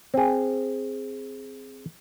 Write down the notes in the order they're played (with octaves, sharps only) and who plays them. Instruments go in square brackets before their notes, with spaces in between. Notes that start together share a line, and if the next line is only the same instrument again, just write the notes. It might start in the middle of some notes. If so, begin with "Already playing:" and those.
[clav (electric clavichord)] C4 G#4